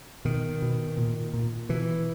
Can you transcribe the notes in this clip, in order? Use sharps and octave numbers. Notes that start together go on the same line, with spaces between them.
B2 D#3
B2
A#2
A#2
B2 E3